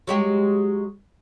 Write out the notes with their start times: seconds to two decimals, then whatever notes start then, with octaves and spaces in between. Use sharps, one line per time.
0.07 F#3 G#3 G4